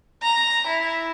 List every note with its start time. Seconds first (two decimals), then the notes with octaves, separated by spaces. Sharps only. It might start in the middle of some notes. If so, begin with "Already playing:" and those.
0.22 A#5
0.67 E4